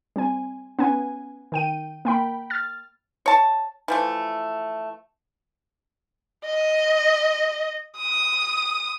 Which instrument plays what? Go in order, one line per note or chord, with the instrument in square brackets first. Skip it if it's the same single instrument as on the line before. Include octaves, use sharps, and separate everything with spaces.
[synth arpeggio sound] G3 C4 G#5
B3 C#4 G#5
D#3 G5 D#7
A#3 G5 B5
F6 A6
[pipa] C#5 A5
E3 F3 A3
[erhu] D#5
D#6